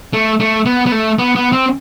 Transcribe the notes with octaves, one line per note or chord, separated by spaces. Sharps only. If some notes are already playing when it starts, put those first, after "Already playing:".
A3
A3
B3
B3
A3
B3
B3
C4